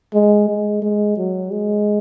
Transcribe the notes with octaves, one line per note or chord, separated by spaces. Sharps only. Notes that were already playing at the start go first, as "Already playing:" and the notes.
G#3
G#3
G#3
F#3
G#3